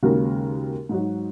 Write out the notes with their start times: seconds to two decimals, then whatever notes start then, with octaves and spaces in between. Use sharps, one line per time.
0.03 D#2 C#3 G#3 F#4 A#4
0.89 G#2 F#3 D#4 F#4